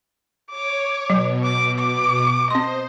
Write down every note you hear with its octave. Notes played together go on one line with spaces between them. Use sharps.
C#5 D6
B2 F#3
D6
D6
C4 C5 D#5 C6